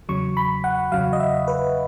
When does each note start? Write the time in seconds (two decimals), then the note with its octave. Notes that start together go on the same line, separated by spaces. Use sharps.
0.09 E2 C#3 F#3 C#6
0.37 B5
0.64 F#5
0.92 E2 C#3 F#3 F5
1.13 D#5
1.20 E5
1.48 B4